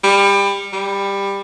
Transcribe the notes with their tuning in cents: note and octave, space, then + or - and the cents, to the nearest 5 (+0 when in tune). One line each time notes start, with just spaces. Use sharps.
G3 +25
G3 +15